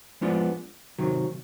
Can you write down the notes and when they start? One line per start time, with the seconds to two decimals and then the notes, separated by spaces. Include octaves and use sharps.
0.21 F3 G#3 B3 D4 F4
0.99 C3 D#3 F#3